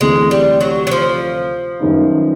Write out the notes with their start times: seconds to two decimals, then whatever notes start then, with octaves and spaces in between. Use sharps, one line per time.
0.01 D2 C3 E3 G#3
0.31 G3
0.61 F#3
0.87 F#3
0.91 F3
1.80 F#2 D#3 G3 B3 D#4